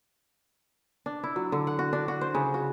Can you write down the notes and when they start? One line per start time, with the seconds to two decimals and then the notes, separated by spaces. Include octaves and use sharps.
1.06 D4
1.24 E4
1.36 F#3
1.52 D3
1.67 F#5
1.79 F#4
1.93 D4
2.08 F#4
2.21 C5
2.35 C#3
2.54 F#4